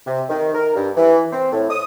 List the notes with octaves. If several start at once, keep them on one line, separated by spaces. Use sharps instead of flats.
C3
D#3
A#4
G2
E3
C4
A2
D#6